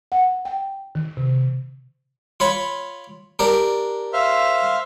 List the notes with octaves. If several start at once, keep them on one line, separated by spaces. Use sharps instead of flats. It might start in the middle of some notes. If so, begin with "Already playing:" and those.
F#5
G5
D#3
C3
F4 C#5 B5
D4 G4 A#4
C5 E5 F5